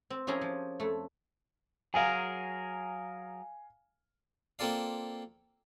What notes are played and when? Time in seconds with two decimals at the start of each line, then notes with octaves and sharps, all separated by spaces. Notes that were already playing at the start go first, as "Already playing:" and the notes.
0.10 C4
0.27 F3 C#4 E4 G4 G#4 A#4
0.41 F3
0.80 F2 A3
1.94 F#3 G#4 A#4 F5 G#5
4.59 A#3 C4 F4 A4 D5 F5